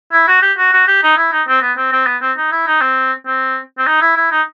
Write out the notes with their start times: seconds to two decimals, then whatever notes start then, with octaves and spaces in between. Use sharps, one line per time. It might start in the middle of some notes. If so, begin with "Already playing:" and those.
0.13 E4
0.28 F#4
0.42 G4
0.58 F#4
0.73 F#4
0.88 G4
1.03 D#4
1.17 E4
1.32 D#4
1.48 C4
1.62 B3
1.77 C4
1.93 C4
2.06 B3
2.22 C4
2.37 D#4
2.52 E4
2.67 D#4
2.81 C4
3.27 C4
3.78 C4
3.87 D#4
4.02 E4
4.17 E4
4.32 D#4